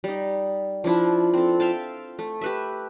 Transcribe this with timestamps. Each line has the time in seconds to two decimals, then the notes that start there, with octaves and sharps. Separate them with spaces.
0.04 G3 D#4
0.84 F3 D4 E4 F4
1.34 C4 A4
1.60 E5 F5 G5 A5
2.19 A3
2.41 G4 B4 E5